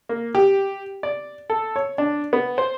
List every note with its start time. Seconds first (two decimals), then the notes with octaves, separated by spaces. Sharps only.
0.09 A#3
0.35 G4
1.03 D5
1.50 A4
1.76 C#5
1.98 D4
2.33 B3
2.58 C5